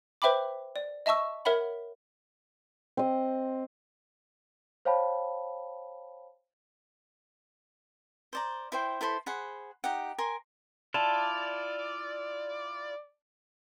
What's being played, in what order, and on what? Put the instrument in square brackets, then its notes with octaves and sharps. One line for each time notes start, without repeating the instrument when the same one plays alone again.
[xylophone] B4 C5 E5 G5 B5 D6
D5
D#5 E5 A5 C#6 E6
A#4 C#5 E5 F#5 B5
[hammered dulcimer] C4 D#5
[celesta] C5 C#5 F5 G5 A5 B5
[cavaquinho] C5 D5 A#5
E4 C5 G5
E4 A4 C5 B5
G#4 C5 F#5 B5
D#4 G4 F#5
A#4 G#5 C6
[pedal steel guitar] E4 F4 [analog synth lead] D5 [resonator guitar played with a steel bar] A5